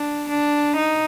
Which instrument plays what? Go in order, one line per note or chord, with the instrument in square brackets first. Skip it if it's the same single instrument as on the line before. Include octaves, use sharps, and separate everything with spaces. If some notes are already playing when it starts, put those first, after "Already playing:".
Already playing: [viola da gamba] D4
D4
D#4